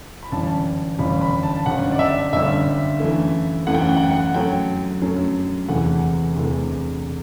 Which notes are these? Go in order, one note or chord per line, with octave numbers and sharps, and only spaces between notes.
B5
G1 F#2 E3 G3 A5
G1 F#2 E3 G3 B5
B5
A5
G1 F#2 D3 G3 F#5
D5
E5
G1 F#2 D3 G3 E5
F#2 E3 A3
F#2 E3 A3 F#5
G5
F#5
G5
F#5
G5
F#5
F#2 F#3 A3 G5
F#2 F#3 A3
E2 C3 E3 A3 F#5
E2 C3 E3 A3